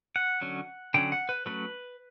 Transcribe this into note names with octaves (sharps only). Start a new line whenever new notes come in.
F#5
D3 F#3 C#4
D3 F#3 C#4 G5
F#5
B4
F#3 A3 C#4 B4